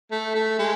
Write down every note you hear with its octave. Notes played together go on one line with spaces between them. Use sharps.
A3
A3
G#3